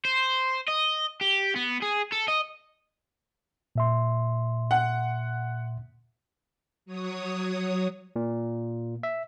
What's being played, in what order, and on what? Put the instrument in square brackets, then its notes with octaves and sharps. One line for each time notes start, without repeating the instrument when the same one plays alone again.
[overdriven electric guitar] C5
D#5
G4
B3
G#4
A4
D#5
[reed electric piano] A#2 E5 C6
[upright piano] F#5
[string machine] F#3 C#5 D#6
[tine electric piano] A#2
E5